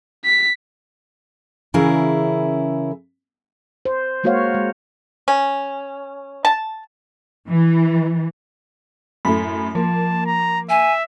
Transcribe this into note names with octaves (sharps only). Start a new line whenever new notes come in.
B6
C#3 E3 C#4 E4 G#4 A#4
C5
G#3 A#3 F#4 C5 C#5 F5
G#3
C#4
A5
E3
F#2 A2 A3 B5
F3 A#3 A5
A#5
E5 G#5